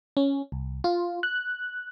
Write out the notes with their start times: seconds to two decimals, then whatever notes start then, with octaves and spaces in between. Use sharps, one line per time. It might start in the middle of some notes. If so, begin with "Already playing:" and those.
0.17 C#4
0.52 C2
0.84 F4
1.23 F#6